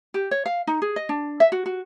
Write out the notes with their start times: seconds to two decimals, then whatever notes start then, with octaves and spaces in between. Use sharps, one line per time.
0.14 G4
0.31 C#5
0.46 F5
0.67 D#4
0.82 G#4
0.96 D#5
1.09 D4
1.40 E5
1.52 F#4
1.66 F#4